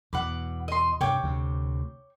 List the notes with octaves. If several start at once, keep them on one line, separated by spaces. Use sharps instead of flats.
E2 B2 F#5 B5 D6
D#5 C6
G2 C3 C#5 G5 D6
D2 C3